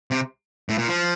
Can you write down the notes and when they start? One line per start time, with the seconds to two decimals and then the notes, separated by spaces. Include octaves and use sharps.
0.11 C3
0.69 A2
0.78 A#2
0.88 F3